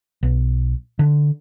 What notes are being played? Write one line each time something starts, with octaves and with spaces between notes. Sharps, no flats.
B1
D3